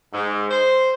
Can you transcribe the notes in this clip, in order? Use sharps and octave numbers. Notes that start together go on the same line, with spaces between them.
G#2
C5